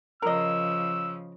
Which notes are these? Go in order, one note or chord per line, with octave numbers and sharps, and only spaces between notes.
C#3 F3 A#4 D#5 E6